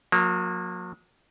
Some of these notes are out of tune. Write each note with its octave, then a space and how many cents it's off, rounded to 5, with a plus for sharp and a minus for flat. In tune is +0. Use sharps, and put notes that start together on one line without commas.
F#3 -40 A#3 +0